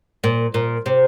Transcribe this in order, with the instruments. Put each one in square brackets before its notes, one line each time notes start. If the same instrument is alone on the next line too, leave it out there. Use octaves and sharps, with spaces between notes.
[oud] A#2
A#2
C3